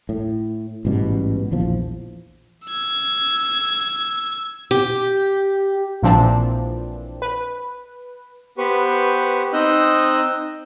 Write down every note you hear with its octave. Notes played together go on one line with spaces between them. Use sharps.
A2
A1 G#2 B2 G3
A#1 E2 F3
E6 G#6
G4
A#1 A#2 E3 F3 C4 D4
B4
B3 G4 B4 C5 C#6
C4 D#4 D#5 E6 F#6 G6